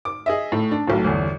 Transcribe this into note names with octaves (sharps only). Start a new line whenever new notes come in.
D6
G#4 D#5 E5
A2
D4
B1 A2
G1 E2